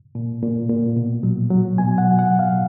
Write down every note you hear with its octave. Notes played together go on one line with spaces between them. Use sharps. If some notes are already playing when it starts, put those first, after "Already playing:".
A#2
A#2
A#2
B2
F#3
F#3
B2 G#5
F#5
F#3
F#5
B2
F5